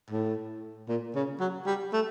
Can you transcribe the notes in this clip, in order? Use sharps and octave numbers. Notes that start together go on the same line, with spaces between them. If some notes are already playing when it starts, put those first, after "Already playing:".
A2
A#2
C#3
F#3
G3
A3